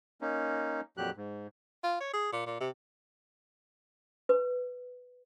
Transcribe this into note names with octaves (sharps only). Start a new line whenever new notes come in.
A#3 C#4 D#4
F2 A#2 F#3 G4 F#6
G#2
F4
C#5
G#4
A#2
A#2
C3
B4